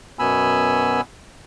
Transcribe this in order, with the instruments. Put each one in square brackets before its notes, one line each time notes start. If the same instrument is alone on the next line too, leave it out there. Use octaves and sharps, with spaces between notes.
[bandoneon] F#2 B2 B3 G#5 B5 E6